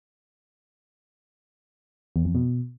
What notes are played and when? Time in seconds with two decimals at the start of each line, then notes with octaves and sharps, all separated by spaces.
2.16 E2
2.25 F2
2.35 B2